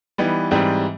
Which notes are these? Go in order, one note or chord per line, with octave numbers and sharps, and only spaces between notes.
E3 G3 B3 D#4
G#2 E3 G3 C4